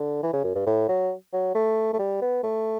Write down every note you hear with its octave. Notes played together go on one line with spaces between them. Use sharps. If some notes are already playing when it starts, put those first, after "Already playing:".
Already playing: D3
E3
C#3
F#2
G2
A2
F#3
F#3
A3
A3
G3
B3
A3